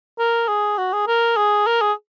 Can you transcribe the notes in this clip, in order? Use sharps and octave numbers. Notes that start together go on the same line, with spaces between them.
A#4
G#4
F#4
G#4
A#4
G#4
A#4
G#4